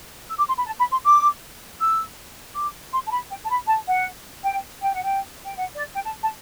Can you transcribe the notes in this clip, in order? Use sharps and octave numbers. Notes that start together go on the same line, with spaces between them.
E6
D6
C6
B5
A5
B5
C6
D6
E6
D6
C6
A5
B5
G5
A5
B5
A5
F#5
G5
G5
F#5
G5
G5
F#5
D5
G5
A5
A5